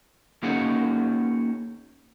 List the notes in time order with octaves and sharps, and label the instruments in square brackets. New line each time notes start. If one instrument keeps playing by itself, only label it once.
[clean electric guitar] A#3 C#4 D#4 F#4 G#4 C#5